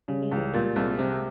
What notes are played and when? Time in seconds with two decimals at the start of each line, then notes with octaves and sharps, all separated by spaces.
0.08 C#3 G3
0.22 G#3
0.31 C#2 E3 G3
0.53 A#2 G3 A#3
0.76 C2 G#3 C4
0.98 C3 G#3 C4